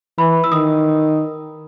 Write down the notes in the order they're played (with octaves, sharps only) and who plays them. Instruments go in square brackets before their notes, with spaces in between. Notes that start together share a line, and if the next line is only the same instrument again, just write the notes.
[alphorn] E3 [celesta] B5
[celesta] E6
[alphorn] D#3 [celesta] D#6